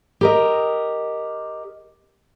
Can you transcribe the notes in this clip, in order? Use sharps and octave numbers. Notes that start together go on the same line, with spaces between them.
G4 A#4 D#5